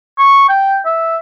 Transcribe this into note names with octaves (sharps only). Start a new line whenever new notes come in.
C#6
G5
E5